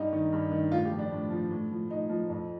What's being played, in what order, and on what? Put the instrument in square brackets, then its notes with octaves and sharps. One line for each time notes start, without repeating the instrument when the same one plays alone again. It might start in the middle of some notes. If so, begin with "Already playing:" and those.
Already playing: [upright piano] G2 D#4
D#3
G2
D#3
A2 F4
G4
F3
D4
A2
F3
A2
F3
A2 D#4
F3
F2